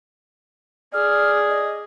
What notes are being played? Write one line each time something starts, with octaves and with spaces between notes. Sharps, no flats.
G#4 D5 F6
D#5